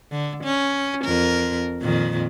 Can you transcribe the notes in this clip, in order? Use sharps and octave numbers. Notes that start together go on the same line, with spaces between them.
D3
C#4
F2 A#4
F2 A#2 D#3